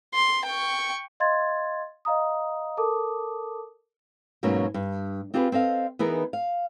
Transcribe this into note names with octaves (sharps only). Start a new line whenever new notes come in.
C6
G5 C#6
D#5 F5 C6 G#6 A6
D#5 F5 A#5 D#6
A4 A#4 A5 D6 D#6
G#2 B2 F#3 A#3 C#4
G2
C4 F4 G4 G#4 A#4 B4
C4 A4 D#5 F5
E3 B3 D#4 G#4 A#4
F5